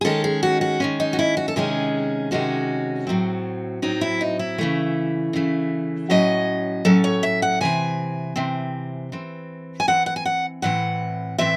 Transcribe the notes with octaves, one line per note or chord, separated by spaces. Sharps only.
G#4
D#3 G#3 C#4 A4
G#4
F#4
F#4
D#3 G#3 C#4
D#4
F#4
E4
F#4
A4
C3 D#3 G#3 C#4 G#4
C3 D#3 G#3 C#4 F#4
A2 F#3 C4
A2 F#3 C4 D#4
E4
D#4
E4
C#3 E3 A3
C#3 E3 A3
A2 F#3 C#4 D#5
A2 F#3 C#4 A4
C#5
E5
F#5
C3 E3 C4 G#5
C3 E3 C4
E3 C4
G#5
E3 C4 F#5
F#5
G#5
F#5
A2 E3 C4 F#5
A2 E3 C4 E5